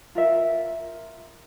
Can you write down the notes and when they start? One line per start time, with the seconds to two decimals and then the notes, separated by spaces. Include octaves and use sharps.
0.15 F4 A#4 E5